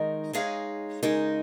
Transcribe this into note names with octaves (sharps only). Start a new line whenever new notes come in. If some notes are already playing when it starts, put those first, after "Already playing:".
Already playing: D#3 G#3 D#4 A#4
G#3 D#4 G#4 C#5 F5
C#3 G#3 D#4 A#4